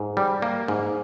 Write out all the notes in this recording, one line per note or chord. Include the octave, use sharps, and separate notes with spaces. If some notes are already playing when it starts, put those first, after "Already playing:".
Already playing: G#2
G3
A#3
G#2